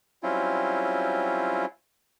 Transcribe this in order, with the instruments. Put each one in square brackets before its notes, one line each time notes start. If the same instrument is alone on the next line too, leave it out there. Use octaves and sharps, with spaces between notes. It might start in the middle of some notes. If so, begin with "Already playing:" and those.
[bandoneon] F#3 G3 C4 C#4 E4 F4